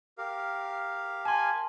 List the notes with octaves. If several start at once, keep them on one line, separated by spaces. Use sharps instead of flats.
G4 A#4 F5
G#5 A5 C6